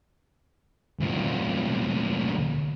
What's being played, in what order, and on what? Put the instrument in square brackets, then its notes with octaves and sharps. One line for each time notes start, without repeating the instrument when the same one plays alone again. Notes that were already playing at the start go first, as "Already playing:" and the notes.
[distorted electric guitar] D2 A#2